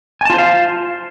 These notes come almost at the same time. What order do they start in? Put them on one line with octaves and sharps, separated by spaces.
G#5 A5 F4 C5 F5